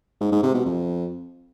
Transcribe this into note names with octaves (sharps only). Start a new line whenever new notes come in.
G#2
G#2
C3
B2
F2